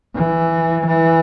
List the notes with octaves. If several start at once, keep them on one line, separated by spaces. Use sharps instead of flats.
E3
E3